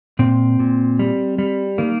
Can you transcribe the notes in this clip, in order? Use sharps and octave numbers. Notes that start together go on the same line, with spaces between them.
A#2 C4
A#2
G3
G3
D#3 A#3